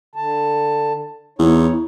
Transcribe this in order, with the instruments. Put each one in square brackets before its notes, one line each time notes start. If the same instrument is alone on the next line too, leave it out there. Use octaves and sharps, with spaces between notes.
[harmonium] D3 A5
[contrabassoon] E2 [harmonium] D#4 C#5